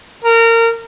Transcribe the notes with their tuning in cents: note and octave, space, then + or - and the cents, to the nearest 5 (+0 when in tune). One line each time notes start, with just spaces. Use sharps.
A#4 -25